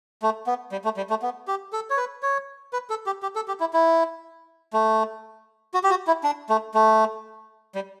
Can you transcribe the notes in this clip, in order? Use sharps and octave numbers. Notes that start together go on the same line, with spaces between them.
A3
B3
G3
A3
G3
A3
B3
G4
A4
C#5
B4
C#5
B4
A4
G4
G4
A4
G4
E4
E4
A3
F#4
G4
F#4
E4
D4
A3
A3
G3